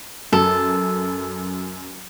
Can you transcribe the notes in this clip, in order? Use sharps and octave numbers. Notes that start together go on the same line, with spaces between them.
F#2 A4